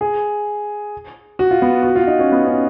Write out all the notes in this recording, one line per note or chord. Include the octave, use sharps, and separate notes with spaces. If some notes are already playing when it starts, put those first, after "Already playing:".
G#4
F#4
F4
B3
F#4
F4
D#4
C#4
B3
C#4